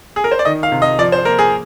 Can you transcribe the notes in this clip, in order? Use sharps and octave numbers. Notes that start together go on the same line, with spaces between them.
G#4
A#4
C5
D5
D#3 D#5
F5
C3
D#5
F3 D5
C5
A#3 A#4
G#4